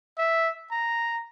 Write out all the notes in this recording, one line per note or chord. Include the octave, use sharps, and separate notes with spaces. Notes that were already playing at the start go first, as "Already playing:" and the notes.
E5
A#5